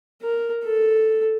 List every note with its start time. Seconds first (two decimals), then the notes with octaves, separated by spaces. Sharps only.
0.22 A#4
0.64 A4